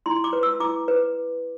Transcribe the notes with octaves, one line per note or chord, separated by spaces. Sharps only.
E4 C6
D6
B4
E6
E4 D6
B4